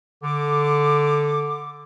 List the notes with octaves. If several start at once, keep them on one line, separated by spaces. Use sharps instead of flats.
D3 D6